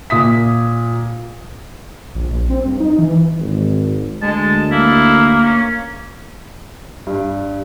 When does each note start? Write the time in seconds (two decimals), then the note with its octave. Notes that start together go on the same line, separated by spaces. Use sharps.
0.10 A#2 D#6 B6
2.15 A#1
2.49 C4
2.66 G2
2.80 D#4
2.98 E3
3.40 G#1
4.22 D2 G#3 A5
4.71 A#3 E4
5.45 C#4
7.07 G2